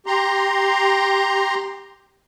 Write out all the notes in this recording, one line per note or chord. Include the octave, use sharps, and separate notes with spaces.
G4 A#5 C6